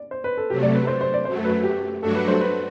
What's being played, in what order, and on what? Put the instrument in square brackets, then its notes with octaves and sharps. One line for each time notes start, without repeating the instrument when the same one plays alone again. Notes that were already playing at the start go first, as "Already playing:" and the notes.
Already playing: [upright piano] D5
C5
B4
A4
[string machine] C3 F#3 A3 [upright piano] G4
[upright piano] D5
B4
C5
C5
D5
[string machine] F#2 F#3 A3 [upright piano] C5
[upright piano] B4
G4
[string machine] G2 F#3 A3 D4 F#4 [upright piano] A4
[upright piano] B4
C5
B4